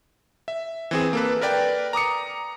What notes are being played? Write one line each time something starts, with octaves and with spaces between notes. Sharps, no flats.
E5
E3 C4 G#4
A#3 A4 B4
A#4 B4 D5 G5
A#5 D6 D#6 C#7